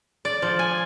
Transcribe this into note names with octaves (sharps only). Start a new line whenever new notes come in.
D5
F3
G#5